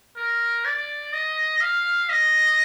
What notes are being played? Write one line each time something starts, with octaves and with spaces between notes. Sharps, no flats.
A#4
D5
D#5
F5
D#5